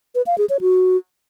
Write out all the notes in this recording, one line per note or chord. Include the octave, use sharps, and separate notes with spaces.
B4
F5
G#4
C#5
F#4